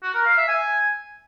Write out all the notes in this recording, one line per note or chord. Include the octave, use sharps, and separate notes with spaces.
F#4
A#4
F5
E5
G#5